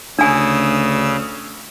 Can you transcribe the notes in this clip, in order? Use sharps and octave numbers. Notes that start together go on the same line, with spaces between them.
D2 C#3 D4 G#5 D#6 E6